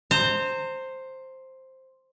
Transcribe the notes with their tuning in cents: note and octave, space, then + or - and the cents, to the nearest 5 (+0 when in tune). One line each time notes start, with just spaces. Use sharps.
C5 +5 A#5 -30